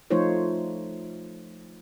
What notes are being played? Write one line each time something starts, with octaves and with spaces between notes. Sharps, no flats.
F3 A3 D#4 F4 C5 C#5